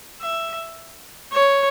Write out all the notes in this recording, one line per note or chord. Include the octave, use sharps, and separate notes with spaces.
E5
C#5